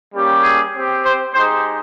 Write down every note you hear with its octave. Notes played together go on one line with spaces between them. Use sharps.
G3 A#3 C#4 G4
G#4
C4 G4
C5
G#3 D#4 G4 C5